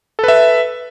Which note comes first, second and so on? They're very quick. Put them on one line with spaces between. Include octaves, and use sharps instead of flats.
A4 B4 E5